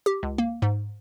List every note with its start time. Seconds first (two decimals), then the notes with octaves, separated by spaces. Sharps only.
0.06 G4
0.23 C#2
0.38 A#3
0.62 G#2